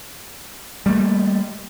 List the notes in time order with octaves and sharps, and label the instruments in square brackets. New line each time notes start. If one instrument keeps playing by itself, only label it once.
[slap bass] G3 A3 A#3